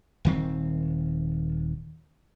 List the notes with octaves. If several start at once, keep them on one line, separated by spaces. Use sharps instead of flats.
D#1 D#3 C4